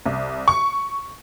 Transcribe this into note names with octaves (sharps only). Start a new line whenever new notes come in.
C2
C#6